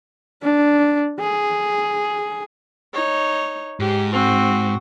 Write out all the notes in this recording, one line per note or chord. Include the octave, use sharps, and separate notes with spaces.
D4
G#4
D#4 C#5
G#2 G4
C4 F#4